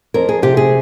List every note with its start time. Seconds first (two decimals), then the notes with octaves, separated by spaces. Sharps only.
0.14 F2 A#4
0.29 G#4
0.42 C3 G4
0.57 G#4